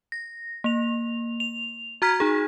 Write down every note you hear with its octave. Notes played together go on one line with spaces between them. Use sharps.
A#6
A#3 F7
F7
F#4 A#5 F6 G#6 B6
D#4 G#4